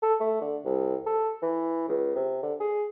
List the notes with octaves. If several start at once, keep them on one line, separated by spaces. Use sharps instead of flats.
A4
A3
D3
C2
A4
E3
C#2
C3
D3
G#4